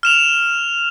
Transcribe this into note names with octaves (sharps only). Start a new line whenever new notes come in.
F6 E7 F7